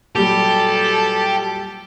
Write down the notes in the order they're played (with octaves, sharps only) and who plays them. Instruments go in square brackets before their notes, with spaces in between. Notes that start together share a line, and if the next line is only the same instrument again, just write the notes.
[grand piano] A#2 F#3 G3 [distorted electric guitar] G4 [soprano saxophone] A4